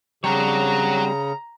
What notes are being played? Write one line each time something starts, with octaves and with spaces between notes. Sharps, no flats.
C#3 G3 C4 D4 F#4 C#5 A#5